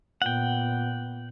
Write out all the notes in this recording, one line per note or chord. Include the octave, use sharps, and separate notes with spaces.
A#2 B3 F#5 G5